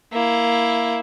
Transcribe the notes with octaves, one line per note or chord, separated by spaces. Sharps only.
A#3 E4